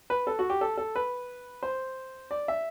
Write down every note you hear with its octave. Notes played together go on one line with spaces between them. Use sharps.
B4
A4
F#4
G4
A4
A4
B4
C5
D5
E5